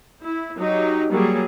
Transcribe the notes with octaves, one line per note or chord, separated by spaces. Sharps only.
E4
F#3 D#4 G4
F#3 G3 A#3 G#4